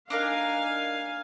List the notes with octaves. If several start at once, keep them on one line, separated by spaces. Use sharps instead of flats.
D4 D#4 A#4 F5 G#5